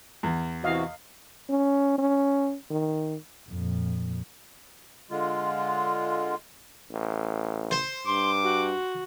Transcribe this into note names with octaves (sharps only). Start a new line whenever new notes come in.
E2
C3 E3 F#4 D#5 F5
C#4
C#4
D#3
F2 A#2
D3 G#3 F4
A1
C5
G2 C6 D6
F#4